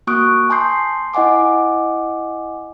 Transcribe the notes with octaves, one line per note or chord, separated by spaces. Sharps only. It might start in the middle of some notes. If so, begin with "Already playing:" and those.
A#3 F#4 C#6 D#6 F#6 D7
G#5 A5 C6 D#6 G6 C7
E4 D#5 F#5 G#5 D6